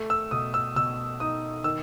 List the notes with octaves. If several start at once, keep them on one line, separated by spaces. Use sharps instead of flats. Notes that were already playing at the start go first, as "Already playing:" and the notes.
Already playing: A3
E6
B2 D#6
E6
B2 E6
D#4 D#6
D#3 E6